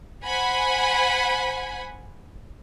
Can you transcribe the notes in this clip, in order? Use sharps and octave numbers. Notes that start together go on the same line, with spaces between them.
C5 F#5 G#5 B5